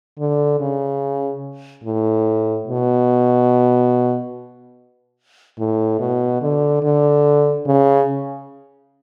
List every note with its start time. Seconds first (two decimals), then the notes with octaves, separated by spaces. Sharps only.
0.19 D3
0.60 C#3
1.84 A2
2.68 B2
5.58 A2
6.00 B2
6.42 D3
6.83 D3
7.66 C#3